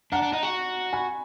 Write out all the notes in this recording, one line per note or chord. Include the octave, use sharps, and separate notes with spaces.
D4 F#5 A#5
D4
D#4 F#5 A#5
F#4
G#5 B5